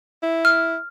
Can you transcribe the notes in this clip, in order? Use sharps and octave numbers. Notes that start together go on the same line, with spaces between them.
E4
F6